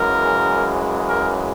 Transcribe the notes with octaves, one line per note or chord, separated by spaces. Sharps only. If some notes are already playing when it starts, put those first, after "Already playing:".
Already playing: F#2 C#3 E3 G#3 A#4
A#4